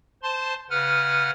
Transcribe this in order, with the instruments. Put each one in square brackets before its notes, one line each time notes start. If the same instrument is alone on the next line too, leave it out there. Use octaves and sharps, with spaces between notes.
[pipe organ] C5 A5 C6
C#3 B4 F#5 F6